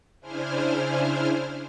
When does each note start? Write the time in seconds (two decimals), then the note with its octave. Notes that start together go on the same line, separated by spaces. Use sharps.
0.20 C#3 D4 E4 C5 G#5 F6